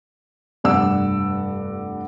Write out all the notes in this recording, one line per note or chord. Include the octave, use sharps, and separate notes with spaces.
F1 G2 D5 F#5 E6